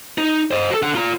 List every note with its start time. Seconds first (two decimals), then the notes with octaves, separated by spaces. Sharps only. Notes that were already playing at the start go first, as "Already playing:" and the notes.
0.18 D#4
0.51 C5 D#5
0.70 F#4 A4
0.82 D3 F#5
0.95 F4 A#5